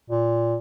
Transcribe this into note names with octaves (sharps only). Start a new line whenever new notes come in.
A#2